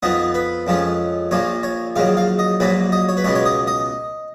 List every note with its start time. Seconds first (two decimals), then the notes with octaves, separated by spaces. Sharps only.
0.03 F2 F3 B3 D#4
0.34 B4
0.67 F2 F3 G#3 C#4
1.31 A#1 A#2 F3 A#3 C#5
1.63 C#5
1.96 A#1 G#2 D#3 F#3 F5
2.17 F5
2.39 D#5
2.60 A#1 G#2 F#3 A#3 B4
2.92 D#5
3.09 C#5
3.17 B4
3.24 C#2 B2 G#3 B3 C#5
3.35 C#5
3.46 D#5
3.67 D#5